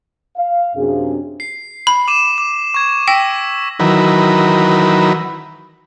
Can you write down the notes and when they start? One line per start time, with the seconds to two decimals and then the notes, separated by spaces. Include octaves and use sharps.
0.36 F5
0.75 F#2 C3 D4 G#4
1.40 C7
1.87 B5
2.08 D6 D#7 E7
2.38 D6
2.74 C#6 G#6
3.08 G5 E6 A#6 B6
3.79 D#3 E3 F#3 A#4 B4